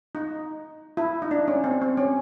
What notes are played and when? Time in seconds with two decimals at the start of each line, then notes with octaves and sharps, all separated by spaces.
0.15 D#4
0.97 E4
1.22 D#4
1.31 D4
1.48 C#4
1.64 C4
1.81 C4
1.97 C#4